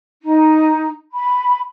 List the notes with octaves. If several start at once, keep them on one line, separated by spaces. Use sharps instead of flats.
D#4
B5